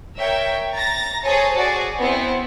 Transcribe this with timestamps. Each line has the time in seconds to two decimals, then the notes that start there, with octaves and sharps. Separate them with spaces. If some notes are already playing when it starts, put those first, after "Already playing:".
0.17 A#4 C#5 E5 G5
0.74 A#5 A6 A#6
1.23 G#4 A4 C5 C#5 G#5 A5
1.56 F#4 G#4 D5 G#5
2.00 B3 C4 E4